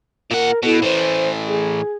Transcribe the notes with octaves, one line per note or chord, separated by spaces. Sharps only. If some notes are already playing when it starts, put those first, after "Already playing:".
A#2 A#4 F#5
B2 E4 A4
A2 E3 C5
G#4